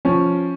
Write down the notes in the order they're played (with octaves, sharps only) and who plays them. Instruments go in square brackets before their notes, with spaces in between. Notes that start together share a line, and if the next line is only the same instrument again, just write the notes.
[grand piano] F3 [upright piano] C#4